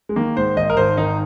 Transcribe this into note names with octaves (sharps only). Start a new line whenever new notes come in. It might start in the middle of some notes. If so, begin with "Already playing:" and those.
G#3
D#3 A#3
G#2 C5
G#1 D#5
A#4
G#1 C5
D#3 D#4